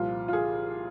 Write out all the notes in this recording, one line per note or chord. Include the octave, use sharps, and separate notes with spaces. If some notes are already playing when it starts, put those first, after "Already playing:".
Already playing: C2 A#2 F3 F4
F4
G#4